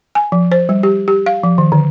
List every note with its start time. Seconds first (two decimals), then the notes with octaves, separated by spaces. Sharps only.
0.15 G#5
0.32 F3
0.52 C5
0.69 G3
0.83 G4
1.08 G4
1.26 F5
1.43 F3
1.58 D#3
1.72 D3